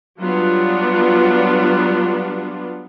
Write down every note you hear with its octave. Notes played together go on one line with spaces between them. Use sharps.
F#3 G3 B3 D4 F4